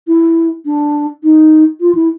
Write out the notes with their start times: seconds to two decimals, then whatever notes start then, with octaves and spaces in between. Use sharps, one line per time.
0.08 E4
0.66 D4
1.23 D#4
1.81 F4
1.95 E4